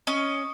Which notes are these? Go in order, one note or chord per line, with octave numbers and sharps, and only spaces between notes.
C#4 D#5